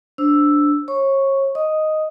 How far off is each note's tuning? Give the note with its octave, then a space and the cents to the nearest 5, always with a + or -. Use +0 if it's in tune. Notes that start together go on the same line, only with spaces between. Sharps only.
D4 -5 C5 +0 E6 +0
C#5 -35 C#6 +0
D#5 +0 D#6 +0